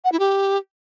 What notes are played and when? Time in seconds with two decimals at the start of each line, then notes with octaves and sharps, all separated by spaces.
0.05 F#5
0.12 E4
0.20 G4